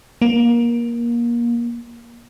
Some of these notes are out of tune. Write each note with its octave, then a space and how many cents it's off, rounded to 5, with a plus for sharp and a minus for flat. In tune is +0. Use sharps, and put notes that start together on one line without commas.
A#3 +25